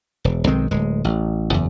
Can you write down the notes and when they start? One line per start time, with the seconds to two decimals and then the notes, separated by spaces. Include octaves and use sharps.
0.25 E1
0.47 B1 D#3 G#3 C4
0.71 D1 G#3
1.04 A1
1.50 F#1 E2